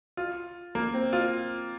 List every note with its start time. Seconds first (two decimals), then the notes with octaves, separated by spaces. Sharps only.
0.17 F4
0.75 A#3
0.94 C4
1.13 F4